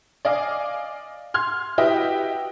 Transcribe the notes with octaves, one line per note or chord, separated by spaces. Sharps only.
D5 D#5 F5 G#5 D6
C6 F6 G#6
E4 F#4 G4 B4 D#5 E5